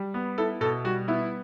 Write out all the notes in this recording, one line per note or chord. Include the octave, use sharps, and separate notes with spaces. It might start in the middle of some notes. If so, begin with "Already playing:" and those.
Already playing: G3
B3
E4 A4
B2 A4
G3 F#4
B3 E4